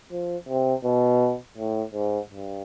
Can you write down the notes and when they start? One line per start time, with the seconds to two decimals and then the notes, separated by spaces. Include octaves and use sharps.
0.12 F3
0.49 C3
0.84 B2
1.57 A2
1.94 G#2
2.31 G2